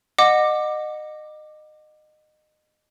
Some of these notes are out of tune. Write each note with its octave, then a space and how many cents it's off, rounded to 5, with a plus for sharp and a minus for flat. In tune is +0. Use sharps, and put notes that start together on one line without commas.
D#5 -25 F#5 -15 D6 +15